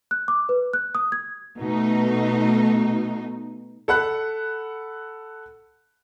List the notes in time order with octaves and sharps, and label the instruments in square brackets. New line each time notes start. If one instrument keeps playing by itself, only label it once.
[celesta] F#6
D6
B4
F#6
D#6
G#6
[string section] B2 A3 D#4
[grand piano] A4 F#5 B5 F#6